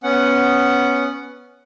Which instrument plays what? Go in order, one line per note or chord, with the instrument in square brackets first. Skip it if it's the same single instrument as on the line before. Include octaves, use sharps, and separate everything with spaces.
[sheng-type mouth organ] B3 C#4 F#5